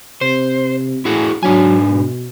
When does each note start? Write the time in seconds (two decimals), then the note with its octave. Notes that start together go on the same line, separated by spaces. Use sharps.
0.21 C3 C5
1.05 A2 E4 F#4 G#4
1.43 G#2 F#3 D4 G#5
1.90 B2